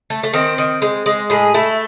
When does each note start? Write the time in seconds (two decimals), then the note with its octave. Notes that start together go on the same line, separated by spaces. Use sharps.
0.10 A3
0.23 A3
0.33 D#3 C4
0.58 D#3
0.82 G#3
1.06 G#3
1.30 A2 G#4
1.54 A3 E4